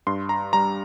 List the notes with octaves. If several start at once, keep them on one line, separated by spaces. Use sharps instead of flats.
G2 C6
A#5
G3 A#5